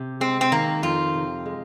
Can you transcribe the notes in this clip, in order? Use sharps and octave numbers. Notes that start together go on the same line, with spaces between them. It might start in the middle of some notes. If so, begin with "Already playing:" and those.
Already playing: C3
G#3 C4
C4
D#3 A#3
F2 F4
C3
G#3